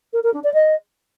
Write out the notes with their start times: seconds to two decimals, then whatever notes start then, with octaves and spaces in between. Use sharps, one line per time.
0.13 A#4
0.23 A#4
0.33 D4
0.43 D5
0.54 D#5